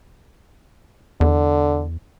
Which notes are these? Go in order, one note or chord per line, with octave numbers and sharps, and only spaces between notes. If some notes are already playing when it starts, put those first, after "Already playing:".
E2 D3